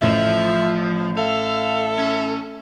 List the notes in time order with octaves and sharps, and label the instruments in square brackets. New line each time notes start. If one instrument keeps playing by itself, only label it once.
[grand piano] A1 A2 D#5 [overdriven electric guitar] F3 [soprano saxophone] E5
[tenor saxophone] A4 [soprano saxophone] E5 [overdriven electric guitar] F5
[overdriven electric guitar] C#4